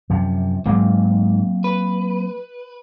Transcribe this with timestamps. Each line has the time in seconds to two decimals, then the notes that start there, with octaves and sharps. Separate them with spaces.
0.10 F#2 C3 F3
0.66 G#2 F#3 A#3 C4
1.64 B4